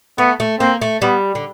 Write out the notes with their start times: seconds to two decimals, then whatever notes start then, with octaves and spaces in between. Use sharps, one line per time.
0.18 A3 B3
0.40 A3
0.60 A#3 C4
0.82 A3
1.02 G3 B3
1.35 D3